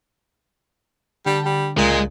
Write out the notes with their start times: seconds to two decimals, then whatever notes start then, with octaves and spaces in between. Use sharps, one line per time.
1.26 D3 G3 G5 A5
1.45 G3
1.78 C#2 A#2 G#3